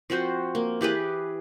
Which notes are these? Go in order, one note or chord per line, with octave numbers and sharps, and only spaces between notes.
F3 C4 F#4 C5
A#3
E3 G4 G#4 B4